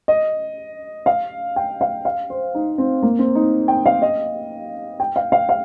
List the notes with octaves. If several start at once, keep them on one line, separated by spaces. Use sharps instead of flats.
D#5
F5
G5
F5
F5
C5
D#4
C4
A#3
C4
D#4
G5
F5
D#5
G5
F5
F5
F5